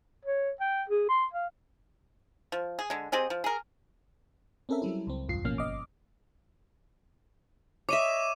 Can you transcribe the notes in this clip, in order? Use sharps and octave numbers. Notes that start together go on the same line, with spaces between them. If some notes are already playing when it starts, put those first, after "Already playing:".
C#5
G5
G#4
C6
F5
F3
G#4
D3 G#3
C4 G4 G#4 D#5
F3
G#4 A#4
C4 C#4 A4 A#4 E5
F#3 G3 E4
C#2 C4
B1 E2 G2 F4 C7
A1 B2 F3 A#3 C#4 F6
G1 D#5 D6
C#5 D#5 E5 D6 D#7 E7